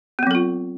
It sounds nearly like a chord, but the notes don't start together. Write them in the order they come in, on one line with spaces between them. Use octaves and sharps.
B3 C4 F#3 A4 F4